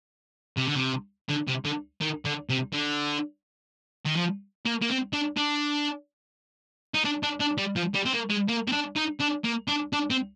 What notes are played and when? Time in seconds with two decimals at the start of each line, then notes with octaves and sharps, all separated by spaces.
0.57 C3
0.67 D3
0.76 C3
1.29 D3
1.47 C3
1.65 D3
2.01 D#3
2.25 D3
2.50 C3
2.73 D3
4.06 D#3
4.17 F3
4.65 A#3
4.82 A#3
4.89 C4
5.13 D4
5.37 D4
6.94 D#4
7.05 D4
7.23 D4
7.40 D4
7.58 G3
7.76 F3
7.94 G3
8.05 C4
8.13 A#3
8.30 G#3
8.49 A#3
8.68 C4
8.72 D4
8.96 D#4
9.20 D4
9.44 A#3
9.68 D4
9.93 D4
10.10 C4